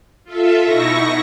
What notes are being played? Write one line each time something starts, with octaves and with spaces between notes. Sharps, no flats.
F4 A4 E5
B2 D#4 E4 C#6 A#6